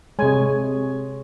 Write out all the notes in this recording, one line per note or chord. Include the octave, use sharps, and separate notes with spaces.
C3 G#3 C#5 G#5